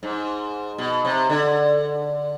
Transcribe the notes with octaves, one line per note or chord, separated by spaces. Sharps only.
G#2
B2
C3
D3